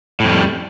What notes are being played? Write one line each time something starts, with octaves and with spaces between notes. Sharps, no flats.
F2 A2 G3